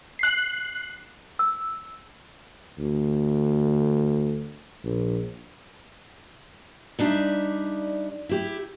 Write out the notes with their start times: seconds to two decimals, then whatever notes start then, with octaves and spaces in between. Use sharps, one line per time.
0.19 F#6 C7
1.39 E6
2.78 D2
4.84 A#1
6.99 G3 D4 D#4 D5 E5
8.29 E4 G4